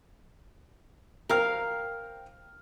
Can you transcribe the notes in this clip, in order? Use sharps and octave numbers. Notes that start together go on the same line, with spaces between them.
A#4 C5 F5 G5 F6